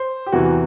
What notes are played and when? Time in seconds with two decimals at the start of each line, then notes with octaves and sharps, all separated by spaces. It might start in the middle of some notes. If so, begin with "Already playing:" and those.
Already playing: C5
0.26 G4
0.32 E2 C3 E3 F#4